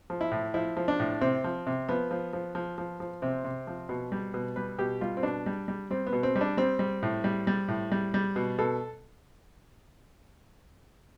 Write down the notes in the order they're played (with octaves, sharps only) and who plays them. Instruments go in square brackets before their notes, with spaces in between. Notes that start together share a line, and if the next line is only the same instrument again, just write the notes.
[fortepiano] F3
E4
A2
F3 E4
F3
D4
A2
C3 C4
F3
C3
F3 B3
F3
F3
F3
F3
F3
C3 C4
C3
F3
B2
G3
B2
G3 B4
B2 G4
G3 F4
C4
B2 D4
G3
G3
G3 C4
B3
B2
C4
G3
D4
G3 C4
G3
A2
G3
G3
A2
G3
G3
B2
B2 A4